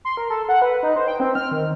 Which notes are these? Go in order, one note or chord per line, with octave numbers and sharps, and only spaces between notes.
C6
A#4
A4
F#5
B4
D#4
C5
G5
C4
F6
D#3